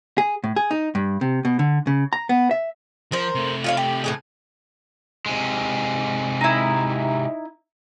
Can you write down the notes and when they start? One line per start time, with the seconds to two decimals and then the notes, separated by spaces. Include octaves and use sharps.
0.18 G#4
0.44 A2
0.56 G#4
0.71 D#4
0.95 G2
1.21 C3
1.45 B2
1.59 D3
1.87 C#3
2.13 A#5
2.29 B3
2.51 E5
3.12 F3 A#4 C5
3.35 C3 A3
3.64 F4 C#5 F5
3.77 G4
4.04 A2 E3 G#4
5.26 C3 G#3
6.41 D#4 E4